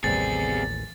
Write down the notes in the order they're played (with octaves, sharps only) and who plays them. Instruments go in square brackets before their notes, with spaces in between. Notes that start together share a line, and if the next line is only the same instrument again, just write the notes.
[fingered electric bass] A1 D#2 [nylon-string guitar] C3 G3 [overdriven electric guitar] B3 G#4 [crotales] A6